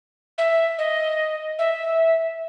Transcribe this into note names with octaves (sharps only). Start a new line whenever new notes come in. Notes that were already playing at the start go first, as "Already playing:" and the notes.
E5
D#5
E5